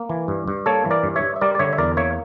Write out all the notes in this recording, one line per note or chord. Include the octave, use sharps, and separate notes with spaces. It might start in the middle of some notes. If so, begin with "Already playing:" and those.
Already playing: A#3
E3
G2
G2
A#3 A4 C#5
E3
A#4 D5
G2
C#5 E5
G2
E5
G3 A#4 D5
D5
D3 C#5 E5
E5
E2 A#4 D5
A#3 C#5 E5